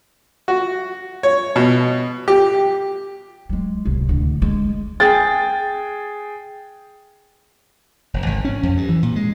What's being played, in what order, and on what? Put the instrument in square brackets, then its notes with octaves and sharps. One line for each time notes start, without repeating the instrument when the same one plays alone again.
[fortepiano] F#4
C#5
B2
G4
[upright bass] F#3 G#3
D1 C2
D2 D3
G#3
[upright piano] G#4 G5 A6
[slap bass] F1
G#1
C#4
F2
G2
E3
A#2
G#3